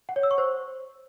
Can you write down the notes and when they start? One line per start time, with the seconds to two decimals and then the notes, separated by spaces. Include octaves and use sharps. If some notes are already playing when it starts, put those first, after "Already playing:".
0.09 F#5
0.16 C#5
0.23 E6
0.31 C#6
0.38 C5